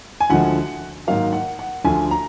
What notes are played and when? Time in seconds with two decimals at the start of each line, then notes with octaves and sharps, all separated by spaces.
0.20 G#5
0.30 D2 D3 F3 G#3 F#5
1.07 G#2 D#3 F#3 A#3 F5
1.33 F#5
1.59 F#5
1.84 D2 D3 F3 G#5
2.11 A#5